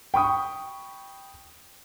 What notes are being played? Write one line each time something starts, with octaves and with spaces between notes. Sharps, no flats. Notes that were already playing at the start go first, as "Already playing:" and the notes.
G5 B5 C#6 D#6